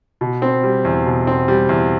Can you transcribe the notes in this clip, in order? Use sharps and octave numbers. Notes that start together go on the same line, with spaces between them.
B2
C4
G3
E2
B2
C4
G3
E2